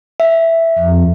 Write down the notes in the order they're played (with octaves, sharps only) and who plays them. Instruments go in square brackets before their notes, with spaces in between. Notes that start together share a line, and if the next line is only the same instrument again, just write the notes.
[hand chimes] E5
[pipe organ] F2